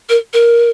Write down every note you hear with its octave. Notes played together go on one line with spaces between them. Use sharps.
A#4
A#4